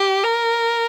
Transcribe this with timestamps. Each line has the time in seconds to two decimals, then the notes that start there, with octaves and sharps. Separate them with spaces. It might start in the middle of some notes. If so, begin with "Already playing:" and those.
Already playing: G4
0.23 A#4